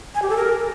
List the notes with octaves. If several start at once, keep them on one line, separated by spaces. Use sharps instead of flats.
G#5
G4
A4
A#4